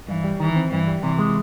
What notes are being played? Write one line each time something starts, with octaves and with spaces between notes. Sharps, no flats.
G2 E3
G3
D#3 E3
C4
G2 E3
G3
C3 E3
G#3